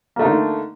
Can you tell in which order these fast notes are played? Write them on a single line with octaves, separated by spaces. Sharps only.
A#3 A3 D#4 D3